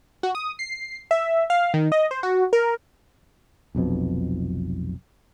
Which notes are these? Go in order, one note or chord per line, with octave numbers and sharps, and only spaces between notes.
F#4
D#6
C7
E5
F5
D#3
D#5
C5
F#4
A#4
F1 B1 F2 B2